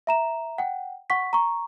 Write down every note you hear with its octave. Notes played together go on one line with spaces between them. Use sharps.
E5 A#5 E7
F#5 G5
F#5 C#6 B6
A#5 C#6